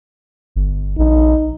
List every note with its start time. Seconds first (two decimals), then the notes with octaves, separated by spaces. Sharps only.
0.56 G1
0.98 A#1 D#4